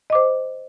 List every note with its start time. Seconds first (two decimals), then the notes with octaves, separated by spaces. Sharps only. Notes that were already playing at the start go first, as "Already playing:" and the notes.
0.10 D#5
0.13 D6
0.15 C5